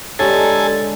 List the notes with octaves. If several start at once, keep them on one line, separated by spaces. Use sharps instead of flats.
D3 G#3 G4 A4 C#5 G#5 A#5